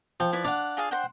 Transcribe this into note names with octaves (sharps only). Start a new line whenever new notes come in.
F3 G5
E4 B4 D5
D4 F5 F#5
F4 G#4 F5
C5 F#5 G5